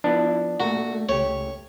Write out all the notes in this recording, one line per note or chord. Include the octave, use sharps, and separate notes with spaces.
F3 B3 D4 E4 B4
A#2 A3 F#4 A#4
C#2 A3 G4 C#5